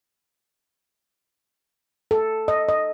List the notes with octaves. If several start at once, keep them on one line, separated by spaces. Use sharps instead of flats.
A4
D#5
D#5